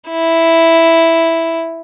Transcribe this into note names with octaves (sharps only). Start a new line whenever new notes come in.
E4